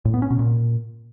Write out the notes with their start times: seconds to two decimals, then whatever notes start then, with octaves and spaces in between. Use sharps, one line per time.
0.05 A2
0.14 B3
0.22 C#4
0.30 B2
0.39 A#2